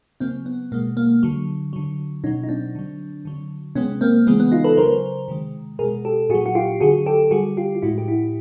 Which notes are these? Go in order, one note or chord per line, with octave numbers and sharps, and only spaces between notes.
C#3 F#3 A#3 C4
B3
B2 G#3 A#3
A#3
D3 F#3
D3 F#3
B2 F#3 C#4 D#4
D#4
C4 D4
D3 F#3
D3 F#3
C3 F3 G#3 B3 C#4
A#3 C4
C#3 E3 G#3 B3
B3
D#4 F4
A4 B4
C#3 F#3 A#4 C5
C3 D#3 G#3
B2 G#4 A#4
G#3
G4 A4
A#2 F#4 G#4
F#3
F#4
F4 G4
D3 F#3 F#4 G#4
G4 A4
D3 G3 F#4 G#4
F4 G4
F4
A2 F3 G#3 E4 F#4
G4
E4 F#4